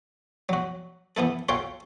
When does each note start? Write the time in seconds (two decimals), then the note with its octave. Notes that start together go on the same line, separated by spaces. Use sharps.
0.49 F#3 F#4
1.17 E3 B3 E4 A4
1.49 F4 F#4 A4 C#5 F5 G5